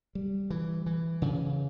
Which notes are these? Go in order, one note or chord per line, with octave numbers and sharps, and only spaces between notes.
G3
E3
E3
C#3